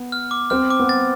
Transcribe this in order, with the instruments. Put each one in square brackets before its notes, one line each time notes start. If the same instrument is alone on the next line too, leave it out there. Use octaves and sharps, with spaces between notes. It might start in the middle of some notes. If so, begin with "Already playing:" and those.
Already playing: [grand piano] B3
[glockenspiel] F6
D6
[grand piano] C4 [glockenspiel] F6
[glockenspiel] D6
[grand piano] B3
[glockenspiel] A6